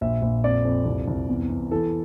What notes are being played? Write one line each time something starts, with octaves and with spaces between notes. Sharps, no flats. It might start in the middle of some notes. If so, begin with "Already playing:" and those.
A#1 E5
A#1
F2 D5
F2
C2
C2
E2
E2
E3 A4